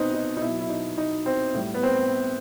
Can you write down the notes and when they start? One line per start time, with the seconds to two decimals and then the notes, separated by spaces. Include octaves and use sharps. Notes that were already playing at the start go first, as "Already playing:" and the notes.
Already playing: B2 B3 C4 D#4
0.14 D#4
0.37 D#4
0.41 B2 F#3 E4
0.60 E4
0.69 D#4
0.98 D#4
1.26 C4
1.55 A2 G3
1.74 B3
1.83 C4